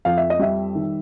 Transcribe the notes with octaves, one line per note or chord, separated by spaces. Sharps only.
F2 F5
E5
D#5
G3 E5
D#3